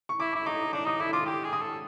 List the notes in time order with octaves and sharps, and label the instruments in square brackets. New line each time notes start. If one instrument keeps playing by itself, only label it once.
[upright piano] C#6
[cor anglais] E4 [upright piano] D6
[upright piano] D6
[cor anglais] E4
[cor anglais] D#4 [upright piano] D6
[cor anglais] D4 [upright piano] D6
[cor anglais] D#4 [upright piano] D#6
[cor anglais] E4 [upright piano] D6
[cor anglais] F4 [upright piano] D6
[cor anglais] G4 [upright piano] D6
[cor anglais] G#4
[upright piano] D#6
[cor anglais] A4